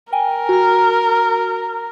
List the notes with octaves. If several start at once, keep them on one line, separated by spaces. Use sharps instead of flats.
A#4 G5 G#5
F#4 F6